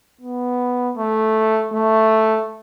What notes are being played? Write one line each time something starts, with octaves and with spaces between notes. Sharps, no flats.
B3
A3
A3